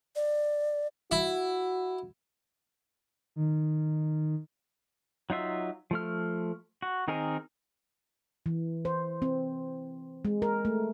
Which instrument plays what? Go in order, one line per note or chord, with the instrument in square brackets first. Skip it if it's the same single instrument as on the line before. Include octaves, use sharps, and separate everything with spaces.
[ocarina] D5
[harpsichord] E4 [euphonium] F#4
[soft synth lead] D#3
[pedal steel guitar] F#3 D#4 F4 E5
F3 A3 F6
F#4
D#3 C4 D#4 G#4 A#4
[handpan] E3
C5
C4
G#3
A#4
A3